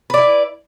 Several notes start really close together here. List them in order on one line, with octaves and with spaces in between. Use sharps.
B4 D5 E4